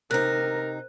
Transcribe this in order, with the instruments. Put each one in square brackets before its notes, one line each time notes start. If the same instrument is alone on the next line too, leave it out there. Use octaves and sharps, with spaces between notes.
[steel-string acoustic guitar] C3 D#4 [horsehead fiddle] A#4 [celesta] C5 F#6